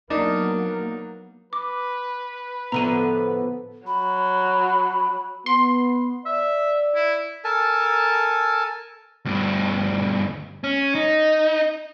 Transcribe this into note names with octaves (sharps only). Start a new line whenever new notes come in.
F#3 A#3 B3 D4 D#4 A#4
B4 D6
A2 D3 F3 B3 A#5 D#7
F#3 B5
B3 C6
D5 E5
E4
A4 A#4 G#5 A5
D2 G2
C#4
D#4